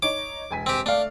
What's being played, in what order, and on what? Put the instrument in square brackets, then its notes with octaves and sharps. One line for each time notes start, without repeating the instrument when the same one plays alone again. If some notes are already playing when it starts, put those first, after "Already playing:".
[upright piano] D#4 C#5 [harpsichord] D6
[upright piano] E1 G#5 B6
[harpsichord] C4 G4
[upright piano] A3 D5 F5 [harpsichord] D4